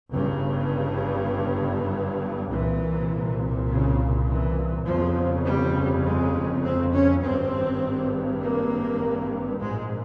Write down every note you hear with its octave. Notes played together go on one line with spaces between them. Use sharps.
G1 G2 C#3
C2 A#2 E3
C#3
E3
G1 F2 C#3 F3
G3
G#3
C4
C#4
G#1 G2 C4
A#3
A#1 G#2 G#3